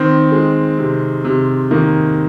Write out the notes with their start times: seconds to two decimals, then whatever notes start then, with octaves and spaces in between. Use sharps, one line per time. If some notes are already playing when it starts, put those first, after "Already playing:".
Already playing: D#3 C4
0.32 G#3
0.78 C3
1.25 C3
1.71 D#3 A#3